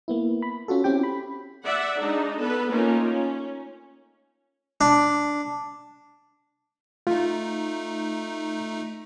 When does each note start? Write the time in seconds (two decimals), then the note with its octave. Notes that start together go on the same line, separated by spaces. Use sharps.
0.08 A#3 B3 E4
0.42 B5
0.68 C#4 F4 F#4 A4
0.84 C4 C#4 E4 G4 G5
1.03 B5
1.64 D5 E5 F#5
2.00 G#3 D4 D#4
2.40 B3 A4 B4
2.70 A3 A#3 C#4 D#4 F4 A#4
3.11 C#4
4.81 D4
7.07 A3 D#4 F4